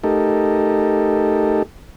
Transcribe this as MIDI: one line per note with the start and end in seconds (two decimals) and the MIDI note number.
0.04 1.63 57
0.04 1.63 63
0.04 1.63 67
0.04 1.63 69
0.04 1.63 70